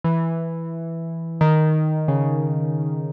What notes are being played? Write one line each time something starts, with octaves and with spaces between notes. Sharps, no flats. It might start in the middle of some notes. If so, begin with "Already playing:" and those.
E3
D#3
C#3